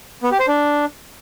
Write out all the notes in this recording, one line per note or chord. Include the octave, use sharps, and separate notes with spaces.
B3
G4
C5
D4